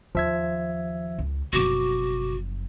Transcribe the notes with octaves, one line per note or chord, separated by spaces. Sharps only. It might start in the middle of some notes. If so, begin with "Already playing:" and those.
D#2 F3 E5 G#6
C#2
F#1 B2 F3 F#4 D6